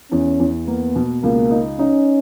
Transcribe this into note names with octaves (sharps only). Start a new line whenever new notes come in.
E2 C#4
E2
A#3 B3
B2
C#2 A#3
D#4
C#4 D#4